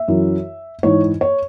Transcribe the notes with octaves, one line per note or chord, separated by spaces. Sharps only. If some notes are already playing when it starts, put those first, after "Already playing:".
Already playing: E5
F#2 E3
G#2 E3 C#5
C#5